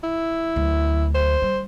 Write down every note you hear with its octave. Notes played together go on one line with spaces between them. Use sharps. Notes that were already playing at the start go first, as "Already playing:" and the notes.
E4
D2 F#3
C5
G3